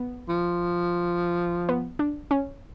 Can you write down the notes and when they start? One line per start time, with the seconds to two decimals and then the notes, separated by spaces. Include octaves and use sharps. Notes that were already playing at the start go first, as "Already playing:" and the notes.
Already playing: B3
0.29 F3
1.69 B3
1.99 D4
2.31 C#4